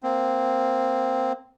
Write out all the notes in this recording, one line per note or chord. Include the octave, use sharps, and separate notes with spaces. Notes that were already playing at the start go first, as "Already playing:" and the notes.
A#3 C4